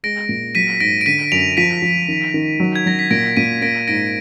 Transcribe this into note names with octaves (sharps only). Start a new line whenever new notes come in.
G#3 A#6 D7
A#2
F#3 B6 D#7
G#2 A#6 D7
D7
D3 B6 D#7
F#2 D7 F7
F3 B6 D#7
F3
D#3
D#3
F#3
G#6
F#3 A#6
B6
A#2 A#6 D7
A#2 B6 D#7
A#3 A#6 D7
G#2 A#6 D7